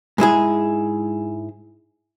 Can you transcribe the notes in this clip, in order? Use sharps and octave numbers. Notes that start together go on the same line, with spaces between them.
G#2 G#3 E4 G#4